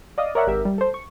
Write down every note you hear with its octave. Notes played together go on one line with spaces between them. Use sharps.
D5 D#5 F5 D#6
A#4 C#5 D5 E5 F#5
G#1 G4 A#4 E5
G3
A4 C5
C#6